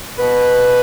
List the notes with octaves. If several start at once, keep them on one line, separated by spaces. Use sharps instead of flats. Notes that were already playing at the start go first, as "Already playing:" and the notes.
B2 B4